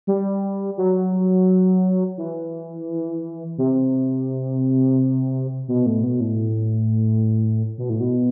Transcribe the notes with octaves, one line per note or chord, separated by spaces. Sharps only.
G3
F#3
E3
C3
B2
A2
B2
A2
B2
A2
B2